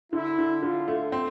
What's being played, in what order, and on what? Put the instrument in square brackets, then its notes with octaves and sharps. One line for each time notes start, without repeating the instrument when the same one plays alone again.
[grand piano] D3 [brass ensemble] E4
[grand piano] D3
[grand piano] D3 [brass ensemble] F4
[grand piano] A3
C4